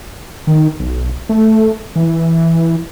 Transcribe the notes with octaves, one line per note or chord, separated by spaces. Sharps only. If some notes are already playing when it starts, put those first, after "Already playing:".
D#3
B1
A3
E3